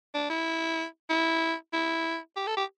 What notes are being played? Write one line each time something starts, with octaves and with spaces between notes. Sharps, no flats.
D4
E4
E4
E4
G4
A4
G4